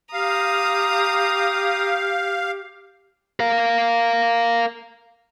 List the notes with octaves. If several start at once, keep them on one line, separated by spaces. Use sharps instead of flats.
G4 F5 A#5 D#6
A#4 F5